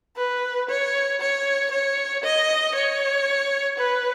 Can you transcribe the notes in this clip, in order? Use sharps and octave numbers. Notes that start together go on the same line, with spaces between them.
B4
C#5
C#5
C#5
D#5
C#5
B4